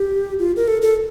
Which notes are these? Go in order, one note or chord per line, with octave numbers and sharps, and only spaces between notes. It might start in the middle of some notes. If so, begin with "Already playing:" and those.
Already playing: G4
F4
A#4
A4
A4